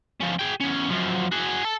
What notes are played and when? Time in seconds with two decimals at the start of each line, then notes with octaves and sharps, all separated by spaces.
0.20 F3 C#4
0.39 G#4 G5
0.61 E2 C#4
0.90 F#2 F3
1.32 F#4 G#4
1.64 A4 A5